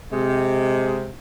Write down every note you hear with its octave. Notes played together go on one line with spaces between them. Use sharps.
C3 G#3